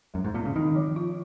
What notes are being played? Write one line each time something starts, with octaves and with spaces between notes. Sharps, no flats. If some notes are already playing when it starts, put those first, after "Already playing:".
F#2 G#3
G#2
A#2 C4
C#3
D#3 D#4
F3
F4